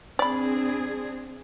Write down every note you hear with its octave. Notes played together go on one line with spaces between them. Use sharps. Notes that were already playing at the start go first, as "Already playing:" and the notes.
C4 D4 G#4 D5 B5